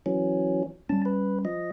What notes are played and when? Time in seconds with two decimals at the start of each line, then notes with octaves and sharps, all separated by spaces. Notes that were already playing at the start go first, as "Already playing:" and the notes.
0.06 E3 F#3 C#4
0.89 G3 C#4 A5
1.05 B4
1.45 F3 D#5